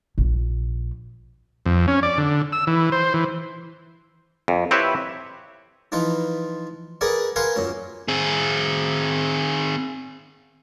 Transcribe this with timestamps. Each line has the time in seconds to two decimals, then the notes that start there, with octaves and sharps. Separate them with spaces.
0.18 A#1
1.66 F2
1.88 C#4
2.03 D5
2.18 D3
2.52 E6
2.67 E3
2.92 C5
3.14 E3
4.48 F2
4.71 C4 E4 G4 B4 C#5 E5
5.92 E3 F3 D#4 F4 B4
7.01 G#4 A#4 B4 D5 F#5
7.36 A#4 B4 F5 F#5 G#5 C6
7.56 F#2 A#2 C#4
8.08 C4 G#4